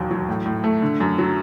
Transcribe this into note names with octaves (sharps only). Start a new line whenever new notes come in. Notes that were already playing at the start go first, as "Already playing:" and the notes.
Already playing: E1 D#2 F#3
F#3
A2
A2
A3
D3
F#2
F#3